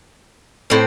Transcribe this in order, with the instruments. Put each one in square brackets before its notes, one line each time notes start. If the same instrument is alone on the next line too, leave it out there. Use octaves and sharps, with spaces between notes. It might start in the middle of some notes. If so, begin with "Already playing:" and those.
[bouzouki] A2 C4